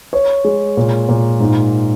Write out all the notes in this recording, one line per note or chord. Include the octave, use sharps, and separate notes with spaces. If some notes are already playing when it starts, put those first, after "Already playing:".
C#5
G#3
A#2
A#2
G#2